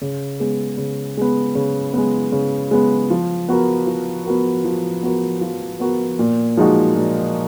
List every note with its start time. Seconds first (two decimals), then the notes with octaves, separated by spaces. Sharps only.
0.02 C#3
0.40 G#3 B3
0.78 C#3
1.17 G#3 B3
1.55 C#3
1.93 G#3 B3
2.32 C#3
2.71 G#3 B3
3.10 F3
3.49 B3 F#4 A#4
3.87 F3
4.26 B3 F#4 A#4
4.64 F3
5.03 B3 F#4 A#4
5.41 F3
5.80 B3 F#4 A#4
6.19 A#2
6.57 F3 G#3 D#4 F#4
6.95 A#2